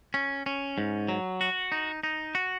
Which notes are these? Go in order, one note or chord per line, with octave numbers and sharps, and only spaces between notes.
C#4
C#4
G#2
F#3
F#4
D#4
D#4
F#4